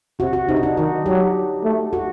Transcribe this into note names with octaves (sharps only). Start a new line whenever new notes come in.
C3 F#4
F#4
C3 D#4
D4
D#4
D#3 F#4
F#3 G4
A3
F#4